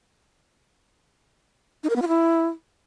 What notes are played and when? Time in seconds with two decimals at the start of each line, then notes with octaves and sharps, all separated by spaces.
1.84 D#4
1.90 A#4
1.96 B3
2.02 F4
2.08 E4